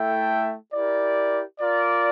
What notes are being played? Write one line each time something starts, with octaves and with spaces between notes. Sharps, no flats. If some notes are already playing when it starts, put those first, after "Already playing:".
Already playing: A3 E4 A4 E5 G5
E4 G4 A#4 D5
F4 A#4 D5